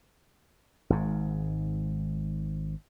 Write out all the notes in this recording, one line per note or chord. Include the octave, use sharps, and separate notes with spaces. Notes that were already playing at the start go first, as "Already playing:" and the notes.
G#1 G#2